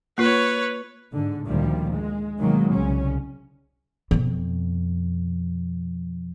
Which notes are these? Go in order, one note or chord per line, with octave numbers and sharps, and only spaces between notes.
A#3 F4 B4 C#5
G#2 D3
D2 A#2 D#3 F3 G3
G#3
B2 D#3 F#3 G#3 A#3
C2 C#3 C#4
F2 B2